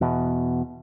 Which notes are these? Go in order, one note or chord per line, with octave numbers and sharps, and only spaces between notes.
E2 B2